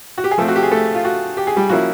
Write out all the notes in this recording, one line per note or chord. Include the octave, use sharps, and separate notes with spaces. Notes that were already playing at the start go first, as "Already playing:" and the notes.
F#4
G4
G#4
F3 A3 C4 A4
F#4
G4
G#4
A3 A4
F4
F#4
G4
G#4
G3 G4
F3 A#3 C#4 E4 F#4